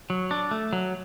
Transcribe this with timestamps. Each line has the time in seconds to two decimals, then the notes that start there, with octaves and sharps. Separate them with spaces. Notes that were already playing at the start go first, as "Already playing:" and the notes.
0.10 F#3
0.31 D4
0.51 A3
0.73 F#3